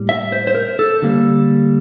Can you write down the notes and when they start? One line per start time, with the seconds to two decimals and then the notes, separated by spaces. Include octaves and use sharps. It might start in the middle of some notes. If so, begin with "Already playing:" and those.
Already playing: A2 G3 A#3
0.09 E5
0.32 C5
0.47 C5
0.55 A#4
0.79 A4
1.02 D3 G3 A#3